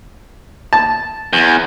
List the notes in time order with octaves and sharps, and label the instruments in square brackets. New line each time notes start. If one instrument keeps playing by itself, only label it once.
[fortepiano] A5
[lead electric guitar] E2